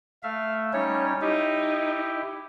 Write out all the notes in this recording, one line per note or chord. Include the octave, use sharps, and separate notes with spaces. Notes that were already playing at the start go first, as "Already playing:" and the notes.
A3 E5 F5
G3 C#4 D#4 C#5
D#4 E4 G4